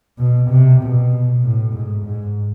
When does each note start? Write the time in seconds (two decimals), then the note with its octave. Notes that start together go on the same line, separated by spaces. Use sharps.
0.19 B2
0.50 C3
0.82 B2
1.43 A2
1.74 G#2
2.05 G#2